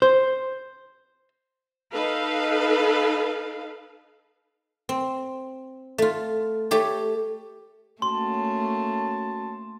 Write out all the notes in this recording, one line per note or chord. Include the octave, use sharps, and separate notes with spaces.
C5
D#4 A4 B4 F5
C4
A3 F4
A3 G4 C#5
A3 A#3 C#4 F#4 A5 C6